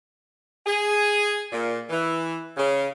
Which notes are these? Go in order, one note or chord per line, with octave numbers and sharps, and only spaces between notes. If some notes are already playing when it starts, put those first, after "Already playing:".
G#4
A#2
E3
C#3